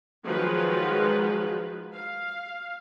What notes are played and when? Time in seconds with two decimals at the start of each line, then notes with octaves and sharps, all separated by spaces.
0.24 D#3 F3 F#3 G#3 B4
1.93 F5